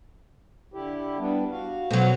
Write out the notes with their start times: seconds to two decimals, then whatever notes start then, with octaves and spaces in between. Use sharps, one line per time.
0.74 D3 E4 G4
1.19 G3 B3 D4
1.51 F#4 F5
1.91 B2 F#3 A4 C5